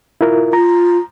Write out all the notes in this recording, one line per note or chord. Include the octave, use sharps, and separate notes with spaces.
E4 F4 A#4
F4 A#5